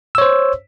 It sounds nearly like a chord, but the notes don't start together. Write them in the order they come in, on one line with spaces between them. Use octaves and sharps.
E6 C#5 C5